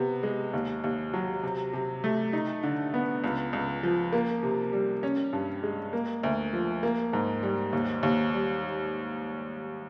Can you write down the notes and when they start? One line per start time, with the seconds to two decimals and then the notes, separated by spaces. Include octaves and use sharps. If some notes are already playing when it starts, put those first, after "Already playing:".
Already playing: C3 B3
0.23 G#3
0.53 D#2
0.84 D#2
1.14 F#3
1.43 C3
1.73 C3
2.04 A3
2.33 D#4
2.63 D3
2.94 B3
3.24 C#2
3.53 C#2
3.83 F3
4.13 A#3
4.43 C3
4.73 G3
5.03 C#4
5.33 G2
5.63 G#3
5.93 A#3
6.23 D2
6.53 F3
6.83 A#3
7.13 G#2
7.43 G3
7.73 D#2
8.03 D#2
8.33 G3